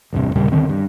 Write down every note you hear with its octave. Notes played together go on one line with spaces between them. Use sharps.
A1 E2 G2 C3
D#2 A#2 C#3 G3
D3 D#3 C4
G2